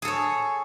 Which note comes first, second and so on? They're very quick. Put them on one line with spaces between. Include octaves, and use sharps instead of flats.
G#4 A4 C#5